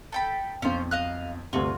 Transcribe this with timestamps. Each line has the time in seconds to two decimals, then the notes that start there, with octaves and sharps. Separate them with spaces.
0.12 A4 G5 B5
0.62 B1 F2 C#4 F4 C5
0.91 D#5 F5 F#6
1.53 D2 G2 C3 F4 F#4